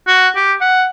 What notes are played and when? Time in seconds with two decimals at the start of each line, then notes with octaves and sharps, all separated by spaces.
0.07 F#4
0.36 G4
0.61 F#5